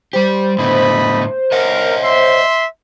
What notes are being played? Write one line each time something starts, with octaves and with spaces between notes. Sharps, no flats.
G3 G4 C5
A2 D3 A3 B3 D#5 B5
A#4 C#5 D#5 F#5
E5 C6